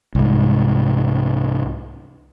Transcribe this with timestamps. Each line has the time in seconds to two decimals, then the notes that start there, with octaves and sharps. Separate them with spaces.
0.15 C2 G#2